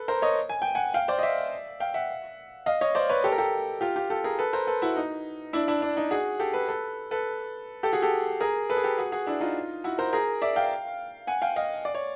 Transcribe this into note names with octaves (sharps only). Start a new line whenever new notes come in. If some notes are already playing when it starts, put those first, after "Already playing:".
Already playing: A4 B4
A#4 C5
C#5 D#5
G#5
G5
F#5 G#5
F5 G5
C5 D5
D#5
D5 E5
F5 G5
E5 F#5
D#5 F5
C#5 D#5
C5 D5
B4 C#5
G4 A4
A#4
G4 A4
F4 G4
F4 G4
G4 A4
G#4 A#4
A4 B4
A#4 C5
A4 B4
E4 F#4
D#4
D4 E4
D4 E4
D4
D#4
F#4 G#4
G4 A4
A4 B4
A4 B4
A4 B4
G4 A4
F#4 G#4
G4 A4
G#4 A#4
A4 B4
G#4
G4 A4
F#4 G#4
F#4 G#4
D4 E4
D#4 F4
E4 F#4
A#4 C5
G#4 A#4
D5 E5
F5 G5
F#5 G#5
F5 G5
D#5 F5
D5
C#5